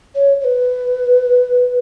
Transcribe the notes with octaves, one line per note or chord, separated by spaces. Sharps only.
C#5
C#5
B4